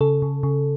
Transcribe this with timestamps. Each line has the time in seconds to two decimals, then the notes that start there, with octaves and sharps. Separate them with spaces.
0.01 C#3 A4
0.22 C#3
0.43 C#3